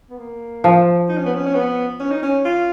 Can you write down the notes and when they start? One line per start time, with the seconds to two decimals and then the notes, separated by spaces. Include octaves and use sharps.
0.10 B3
0.18 A#3
0.64 F3
1.09 D#4
1.18 C#4
1.26 B3
1.35 C#4
1.46 C#4
1.54 B3
2.00 C#4
2.11 D#4
2.23 C#4
2.45 F4